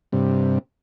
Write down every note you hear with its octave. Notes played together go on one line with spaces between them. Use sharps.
G2 C3